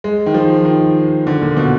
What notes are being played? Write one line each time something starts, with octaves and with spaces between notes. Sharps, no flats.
G#3
D#3
F3
D#3
D3
A#2
B2